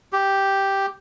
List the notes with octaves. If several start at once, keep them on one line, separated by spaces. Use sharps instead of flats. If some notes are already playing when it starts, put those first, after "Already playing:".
G4